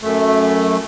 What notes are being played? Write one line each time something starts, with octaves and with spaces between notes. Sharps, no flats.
F#2 A3